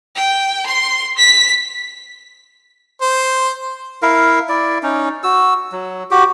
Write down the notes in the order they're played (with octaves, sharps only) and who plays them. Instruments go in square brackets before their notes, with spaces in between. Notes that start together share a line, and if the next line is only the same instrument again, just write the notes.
[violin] G5
C6
B6
[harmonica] C5
[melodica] E4 A#4 F5
E4 D5
C#4 D#4
F#4 E6
F#3
F#4 G4